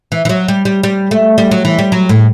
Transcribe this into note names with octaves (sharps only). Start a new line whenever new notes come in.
E3
E3
F#3
G3
G3
G3
A3
G3
F#3
E3
G3
F#3
A2